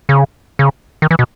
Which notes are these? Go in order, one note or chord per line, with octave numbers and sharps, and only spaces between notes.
C#3
C#3
D#3
E3
B2